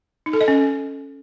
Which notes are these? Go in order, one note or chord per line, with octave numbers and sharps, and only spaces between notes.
D#4
A4
D#5
C#4